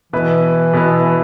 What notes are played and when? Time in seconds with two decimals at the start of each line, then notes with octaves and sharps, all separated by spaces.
0.13 B2 E3 B3 E4 B4
0.73 B2 B3 E4 B4